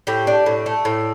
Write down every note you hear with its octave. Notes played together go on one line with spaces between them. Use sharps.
A2 G4
D4
A2
A3
A2